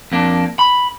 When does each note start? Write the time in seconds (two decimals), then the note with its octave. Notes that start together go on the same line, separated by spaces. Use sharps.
0.12 F2 A#3 D4
0.59 B5